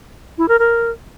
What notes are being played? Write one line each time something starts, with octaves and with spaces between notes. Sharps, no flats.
E4
A#4
A#4